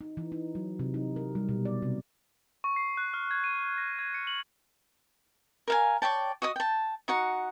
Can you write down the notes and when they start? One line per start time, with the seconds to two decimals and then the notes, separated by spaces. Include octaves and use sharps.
0.01 D#4
0.17 E3
0.32 D#4
0.55 F#3
0.79 C3
0.94 D#4
1.16 A#4
1.35 G3
1.49 B2
1.65 D5
1.82 C3
2.64 C#6
2.76 C7
2.97 F#6
3.14 F6
3.31 G#6
3.44 D#7
3.78 A#6
3.99 G#6
4.14 C#7
4.27 F#7
5.68 A#4 F5 G#5
6.02 C#5 D5 G5 A5
6.42 F#4 D#5 D#6
6.56 G5 A5
7.08 D#4 F#4 F#5